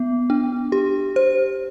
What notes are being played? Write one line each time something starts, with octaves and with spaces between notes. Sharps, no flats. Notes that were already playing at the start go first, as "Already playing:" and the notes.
Already playing: B3
D4
G4
C5